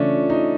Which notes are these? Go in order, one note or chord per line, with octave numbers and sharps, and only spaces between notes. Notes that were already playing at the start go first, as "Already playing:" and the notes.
Already playing: C#3 E3 A3 C#4 D4 F4
D#4